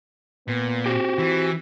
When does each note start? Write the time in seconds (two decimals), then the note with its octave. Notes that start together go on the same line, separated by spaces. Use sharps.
0.48 A#2 B3
0.86 C4 F#4 G4
1.19 E3